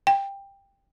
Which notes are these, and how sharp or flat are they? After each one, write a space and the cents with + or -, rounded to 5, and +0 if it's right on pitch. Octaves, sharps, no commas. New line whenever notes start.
G5 +15